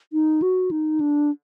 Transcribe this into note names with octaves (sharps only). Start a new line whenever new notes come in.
D#4
F#4
D#4
D4